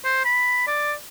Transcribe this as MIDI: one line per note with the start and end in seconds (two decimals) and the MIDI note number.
0.05 0.21 72
0.25 0.62 83
0.67 0.93 74